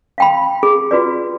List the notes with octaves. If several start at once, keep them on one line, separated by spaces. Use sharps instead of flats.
F5 G5 B5
G#4
F4 F#4 B4 D5